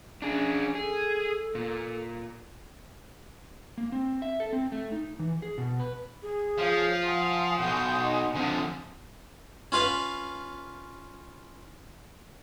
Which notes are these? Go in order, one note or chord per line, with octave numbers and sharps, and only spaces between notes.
C#4 D4 G#4
G#4 A4
A#2
A#3
C4
E5
A4
C4
A3
D#4
E3
G#4
B2
B4
G#4
F3 C#5 F5 G6
F#5 G#5 C6 D#6
B1 B2 G5
D#4
D3 F3 C4
C#4 F4 B4 F5